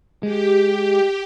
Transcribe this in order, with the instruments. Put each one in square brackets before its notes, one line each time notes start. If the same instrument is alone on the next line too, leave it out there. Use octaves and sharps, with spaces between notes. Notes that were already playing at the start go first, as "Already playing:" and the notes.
[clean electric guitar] G#3 [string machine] G4